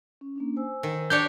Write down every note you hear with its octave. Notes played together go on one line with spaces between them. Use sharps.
C#4
A#3 C#4 D4
C5 G#5 E6
D#3
D4 G4 C#5 D5 G6